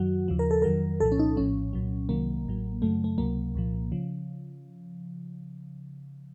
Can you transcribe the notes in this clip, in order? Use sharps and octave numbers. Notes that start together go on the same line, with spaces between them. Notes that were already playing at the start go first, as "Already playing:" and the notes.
Already playing: F#2 D#3 F#3 F#4
D#2 C#3 F3
A#4
A4
F2 D#3 F#3 A#4
C2 A#2 F3 A4
C#4
D#4
A#1 A2 F3 C#4
C2 A#2 F#3
C2 C3 D#3 F#3 A#3
A1 A2 F#3
F#2 C#3 F#3 A3
A3
C#2 C3 F#3 A#3
C2 A#2 F3
C#3 F3